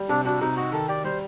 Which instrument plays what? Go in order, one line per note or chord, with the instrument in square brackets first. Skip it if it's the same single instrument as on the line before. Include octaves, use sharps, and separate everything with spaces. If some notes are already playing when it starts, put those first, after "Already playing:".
Already playing: [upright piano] G3
[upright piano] C3 [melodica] D4
[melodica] D4 [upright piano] F#4
[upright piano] C3 [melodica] D#4
[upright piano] D#4 [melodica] F#4
[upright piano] D#3 [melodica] A4
[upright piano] G4 [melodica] D5
[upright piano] G3 [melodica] C5